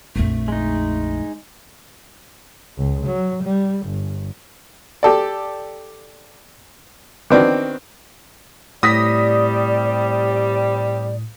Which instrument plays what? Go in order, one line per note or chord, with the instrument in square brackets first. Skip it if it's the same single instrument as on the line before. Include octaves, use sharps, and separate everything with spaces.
[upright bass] A#1 F2 [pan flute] A3
[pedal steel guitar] G#3 D#4
[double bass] C#2
F#3
G3
G1
[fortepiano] G4 A4 D5
D#3 B3 C4 D4 F#4
[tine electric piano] A2 [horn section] C3 G3 [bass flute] D5 [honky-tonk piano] D#6 A#6 B6